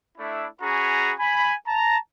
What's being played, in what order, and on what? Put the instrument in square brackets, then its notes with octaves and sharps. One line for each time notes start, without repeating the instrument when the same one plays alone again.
[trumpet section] A3 D4 E4
C#4 F#4 G#4 A#5 B5
G#5 B5
A5 A#5